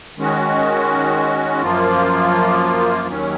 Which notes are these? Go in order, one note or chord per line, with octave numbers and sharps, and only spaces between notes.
D#3 G#3 C#4 F#4
F#2 F3 A#3 F4
D#2 D#3 F#3 C#4